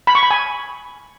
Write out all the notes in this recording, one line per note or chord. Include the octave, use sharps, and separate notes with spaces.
B5
C#6
B5
G#5